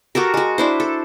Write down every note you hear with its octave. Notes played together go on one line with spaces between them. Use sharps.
F#4 G4 A4 A#4
G#3 F#4
D4 E4 C5
A4